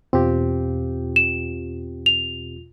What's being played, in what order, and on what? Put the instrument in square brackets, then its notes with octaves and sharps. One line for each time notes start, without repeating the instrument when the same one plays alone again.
[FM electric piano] E2 B2 F4 [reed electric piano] C4 G4
[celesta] E7
F7